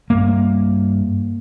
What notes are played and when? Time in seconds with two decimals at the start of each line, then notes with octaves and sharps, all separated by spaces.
0.10 G2 A#3